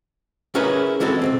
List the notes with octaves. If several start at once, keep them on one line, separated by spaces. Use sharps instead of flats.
C#4 E4 G#4 A#4 B4 C#5
E3 G#3 C4 F#4 A4
B1 F#2 C4